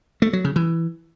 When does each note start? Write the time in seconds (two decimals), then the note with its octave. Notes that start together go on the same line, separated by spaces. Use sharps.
0.22 A3
0.33 F#3
0.45 C#3
0.56 E3